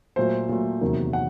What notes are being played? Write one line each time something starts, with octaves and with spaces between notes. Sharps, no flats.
A#2 F#3 A3 C5
A#2 F#3 A3
E2 C3 D#3 F#3 A#3
F#5